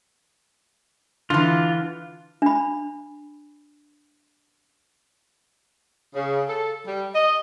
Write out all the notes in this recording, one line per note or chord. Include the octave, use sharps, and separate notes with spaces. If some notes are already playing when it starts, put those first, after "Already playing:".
D3 E3 F4
D4 B5
C#3
A4
G3
D#5